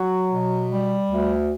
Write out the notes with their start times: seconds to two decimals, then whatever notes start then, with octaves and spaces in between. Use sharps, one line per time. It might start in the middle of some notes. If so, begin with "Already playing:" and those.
Already playing: F#3 F#4
0.31 B2
0.70 G3
1.09 D2